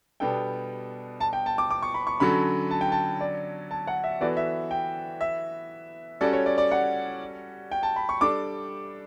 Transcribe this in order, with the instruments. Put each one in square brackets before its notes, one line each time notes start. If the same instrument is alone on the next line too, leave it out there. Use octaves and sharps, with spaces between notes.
[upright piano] B2 G3 B3 D4 A4 [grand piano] G5
[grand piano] A5
G5
A5
D6
D6
C#6
B5
C#6
[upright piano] D3 F#3 C#4 F#4 A4 [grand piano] B5
[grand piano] A5
G5
A5
D5
A5
F#5
E5
[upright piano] E3 B3 F#4 A4 [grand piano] D5
[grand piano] E5
G5
E5
[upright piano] G3 C#4 F#4 A4 [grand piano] D5
[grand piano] C#5
D5
D5
F#5
G5
A5
B5
C#6
[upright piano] G3 D4 A4 [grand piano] D6